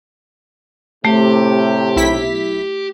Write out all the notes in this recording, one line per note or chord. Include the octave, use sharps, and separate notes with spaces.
A2 C3 A3 G4
B1 E4 B6